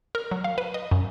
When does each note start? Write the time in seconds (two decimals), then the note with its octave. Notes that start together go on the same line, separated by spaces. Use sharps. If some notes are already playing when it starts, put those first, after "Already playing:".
0.15 A#4
0.31 F#3
0.44 F5
0.58 B4
0.74 D#5
0.91 F#2